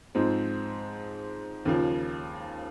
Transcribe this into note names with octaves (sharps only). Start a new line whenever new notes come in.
G#2 F3 G#3 C4
D#2 C#3 F3